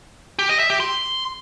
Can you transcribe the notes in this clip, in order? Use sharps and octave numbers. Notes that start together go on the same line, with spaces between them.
G4
D#5
E5
G4
C6